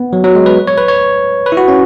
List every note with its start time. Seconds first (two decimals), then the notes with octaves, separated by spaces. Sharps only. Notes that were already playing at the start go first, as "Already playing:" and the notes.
Already playing: B3
0.13 F#3
0.24 F#3
0.35 G#3
0.46 B4
0.67 C#5
0.78 B4
0.88 C#5
1.46 B4
1.52 E4
1.57 F#4
1.68 C#4